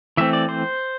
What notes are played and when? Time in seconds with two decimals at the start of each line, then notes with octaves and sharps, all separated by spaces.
0.17 E3 A3 C4 E5
0.33 D5
0.49 C5